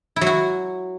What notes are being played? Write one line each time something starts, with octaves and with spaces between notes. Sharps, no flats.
E4
F#3
F#4